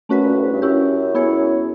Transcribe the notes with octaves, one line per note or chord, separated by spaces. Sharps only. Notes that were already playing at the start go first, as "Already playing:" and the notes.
F#2 A3 C#4 F#4 B4
A#2
A2
G#2
G2
F#2 C#4 E4 G4
B3 E4 G#4 C#5